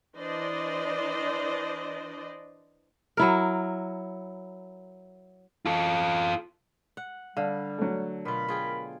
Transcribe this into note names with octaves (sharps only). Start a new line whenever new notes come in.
E3 D4 C5 D5 D#5
F#3 E4 A#4
F4 A4
F#5
D3 G3 F5
F#3 A3
B2 F4 A#4 B5
F4 G#4 G5